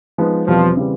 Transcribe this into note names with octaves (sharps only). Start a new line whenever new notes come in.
F3 G#3 B3 D#4
E2 B2 F3 G3 C4
C#3 E3 G3 C4